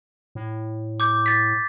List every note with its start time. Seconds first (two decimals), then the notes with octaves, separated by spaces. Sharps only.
0.35 A2
1.00 D6 G6
1.26 A6 B6